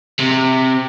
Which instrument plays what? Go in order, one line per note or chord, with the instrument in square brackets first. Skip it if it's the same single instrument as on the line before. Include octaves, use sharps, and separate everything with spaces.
[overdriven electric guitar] C3